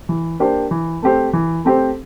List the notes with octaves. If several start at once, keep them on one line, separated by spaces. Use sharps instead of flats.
E3
A#3 D4 G4 C5
E3
A3 C4 G4 C5
E3
A3 C4 G4 C5